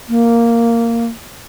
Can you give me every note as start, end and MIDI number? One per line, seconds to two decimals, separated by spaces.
0.09 1.06 58